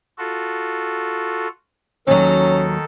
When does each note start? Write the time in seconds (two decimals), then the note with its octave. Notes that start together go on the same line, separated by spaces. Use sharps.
0.18 F4 F#4 A4
2.07 D#2 D#3 F#3 C#4 A4